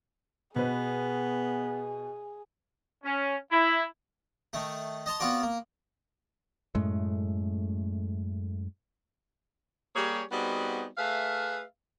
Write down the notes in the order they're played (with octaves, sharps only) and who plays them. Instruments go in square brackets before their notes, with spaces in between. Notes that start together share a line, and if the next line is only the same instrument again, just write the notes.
[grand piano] B2 B4 [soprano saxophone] B3 [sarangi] G#4
[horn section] C#4
E4
[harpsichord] D#3 A3
D#5 A5 A#5 C6
B3 C4 F4 F#4 D5
A#3
[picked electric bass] F#2 A2 G#3 A3
[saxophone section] G3 A#3 G4 G#4 C#5
G3 B3 C4 D#4 F#4 G#4
A3 G#4 B4 E5 F5